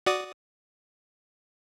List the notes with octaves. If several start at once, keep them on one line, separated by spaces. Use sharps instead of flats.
F#4 D5 D#6